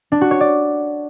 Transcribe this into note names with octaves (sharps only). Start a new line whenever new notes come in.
D4
F#4
C#5
D5